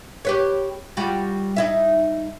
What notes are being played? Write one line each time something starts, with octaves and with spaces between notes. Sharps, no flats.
G4 B4 C#5
G3 F4 F#4
D#4 E4 E5